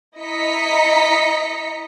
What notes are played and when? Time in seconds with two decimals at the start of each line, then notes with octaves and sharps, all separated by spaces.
0.18 E4 D#5 A#5 B6 C#7